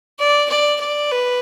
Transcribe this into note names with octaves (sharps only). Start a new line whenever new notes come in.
D5
D5
D5
B4